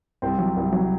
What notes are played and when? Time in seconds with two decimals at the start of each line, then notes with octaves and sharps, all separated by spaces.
0.22 C2 C4
0.38 F#3
0.56 C2
0.72 F#3